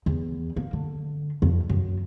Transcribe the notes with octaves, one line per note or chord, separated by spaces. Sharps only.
E2
A#3
D3
F2
F#2